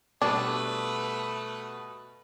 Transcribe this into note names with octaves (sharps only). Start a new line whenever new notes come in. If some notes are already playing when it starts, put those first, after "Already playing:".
B2 G3 A3 D4 B4